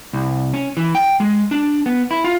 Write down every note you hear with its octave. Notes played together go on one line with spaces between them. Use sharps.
C2
C#4
E3
G5
G#3
D4
B3
E4
F4